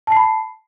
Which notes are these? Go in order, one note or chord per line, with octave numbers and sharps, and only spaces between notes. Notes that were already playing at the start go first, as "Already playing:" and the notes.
A5 B5 C7